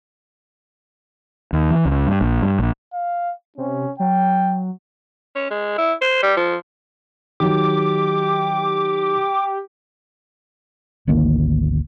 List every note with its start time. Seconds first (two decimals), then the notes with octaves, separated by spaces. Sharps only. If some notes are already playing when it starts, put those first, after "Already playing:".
1.53 D#2
1.71 E3
1.85 C#2
2.07 G2
2.21 A#1
2.42 G2
2.59 A#1
2.94 F5
3.58 C3 C#4
4.00 F#3 G5
5.36 C#4
5.51 G#3
5.78 E4
6.01 C5
6.23 G3
6.37 F3
7.40 D#3 F#3 G4 D6
11.07 G#1 D2 D#3 A#3